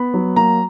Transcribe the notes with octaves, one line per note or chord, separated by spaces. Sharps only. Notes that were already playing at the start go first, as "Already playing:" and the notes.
Already playing: B3 B5
F#3
A#3 A#5